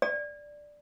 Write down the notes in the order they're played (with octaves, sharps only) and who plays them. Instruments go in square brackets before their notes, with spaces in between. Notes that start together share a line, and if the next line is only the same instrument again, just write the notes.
[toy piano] D5